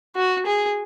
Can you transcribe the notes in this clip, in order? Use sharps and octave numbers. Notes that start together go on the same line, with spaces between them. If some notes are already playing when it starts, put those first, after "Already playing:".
F#4
G#4